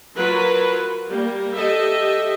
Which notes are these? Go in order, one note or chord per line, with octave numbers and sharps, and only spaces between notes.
F#3 F4 F#4 A#4 B4
G3 A#3
G4 A4 D#5 E5